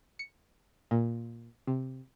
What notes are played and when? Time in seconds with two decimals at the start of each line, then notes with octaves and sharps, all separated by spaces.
0.19 C#7
0.91 A#2
1.67 C3